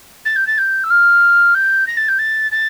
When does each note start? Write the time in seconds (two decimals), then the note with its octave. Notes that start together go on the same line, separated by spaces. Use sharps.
0.25 A6
0.36 G6
0.47 A6
0.58 G6
0.83 E6
0.90 F6
1.54 G6
1.87 A#6
1.97 A6
2.08 G6
2.18 A6
2.51 A6